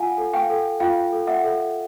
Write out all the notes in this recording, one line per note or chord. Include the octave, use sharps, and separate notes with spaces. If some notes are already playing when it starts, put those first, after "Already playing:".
Already playing: F4 F5 F#5 G#5
A4
F5 G5
A4
F4 F5 G5
A4
E5 F#5
A4